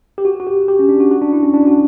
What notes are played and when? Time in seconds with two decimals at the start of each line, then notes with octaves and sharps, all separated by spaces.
0.18 G4
0.25 F#4
0.40 F#4
0.47 G4
0.68 G4
0.79 C#4
0.89 D4
1.00 F#4
1.11 F#4
1.22 D4
1.33 E4
1.43 C#4
1.53 D4
1.67 F#4